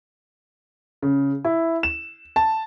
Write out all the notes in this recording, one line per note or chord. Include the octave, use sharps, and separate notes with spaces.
C#3
E4
E7
A5